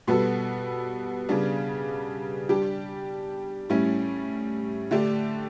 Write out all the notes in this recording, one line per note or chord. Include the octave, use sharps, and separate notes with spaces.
B2 G3 B3 F#4 A4
C#3 G3 B3 D4
G3 D4 G4
A2 G3 C#4 E4
D3 A3 D4 G4